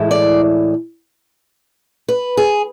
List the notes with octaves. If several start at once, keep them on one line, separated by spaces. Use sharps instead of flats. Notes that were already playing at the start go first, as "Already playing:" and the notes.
Already playing: A2 E3 G#3 E4
D5
B4
G#4